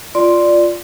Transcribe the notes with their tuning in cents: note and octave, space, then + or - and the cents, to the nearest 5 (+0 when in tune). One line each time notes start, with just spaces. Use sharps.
F4 +0 D5 +0 C6 +0